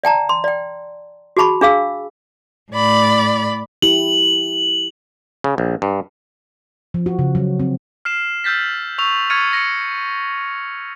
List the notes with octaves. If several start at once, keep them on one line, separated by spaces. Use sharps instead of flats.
D5 G5 A5 A#5
C6
D5 G5
F#4 G#4 A5 B5 C#6
D4 G#4 F5 E6
A2 D5 B5
E4 G4 F#7
C#3
A#1
G2
F3
F#4
C#3
F#3
C4
F6 C7 E7
E6 F6 G6 A6 B6
C#6 E6 F7
C#6 F6 G#6 A6 C#7 D#7
A#6 C#7